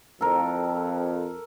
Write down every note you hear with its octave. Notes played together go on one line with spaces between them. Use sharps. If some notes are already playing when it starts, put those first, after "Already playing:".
F2 A4 A#4